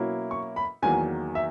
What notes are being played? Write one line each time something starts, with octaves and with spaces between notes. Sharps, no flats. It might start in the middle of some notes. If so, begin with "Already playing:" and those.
Already playing: B2 F#3 A#3 C#4 E4
C#6
B5
E2 D#3 F#3 A#3 G#5
E5